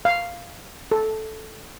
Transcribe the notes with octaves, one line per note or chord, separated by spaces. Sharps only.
F5
A4